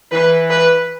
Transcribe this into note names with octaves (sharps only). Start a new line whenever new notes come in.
E3 B4
B4